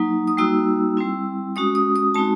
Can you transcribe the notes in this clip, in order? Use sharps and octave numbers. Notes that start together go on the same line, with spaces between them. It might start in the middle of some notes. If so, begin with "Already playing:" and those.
Already playing: F#3 A#3 D#4
D#6
G3 A#3 D#4 F#4 E6
G3 C4 E4
G#3 C#4 F#4 D#6
D#6
D#6
G#3 C4 D#4 F#4 A5